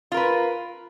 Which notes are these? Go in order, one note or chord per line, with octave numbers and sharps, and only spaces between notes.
F4 A#4 B4